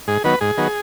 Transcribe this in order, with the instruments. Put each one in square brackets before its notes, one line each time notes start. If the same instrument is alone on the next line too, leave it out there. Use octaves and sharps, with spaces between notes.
[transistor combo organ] G#2 G#4
D#3 F#3 B3 B4
G#2 G#4
D#3 F#3 B3